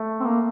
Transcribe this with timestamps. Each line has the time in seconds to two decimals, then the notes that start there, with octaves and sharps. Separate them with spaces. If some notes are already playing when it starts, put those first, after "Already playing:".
Already playing: A3
0.20 C4
0.25 A#3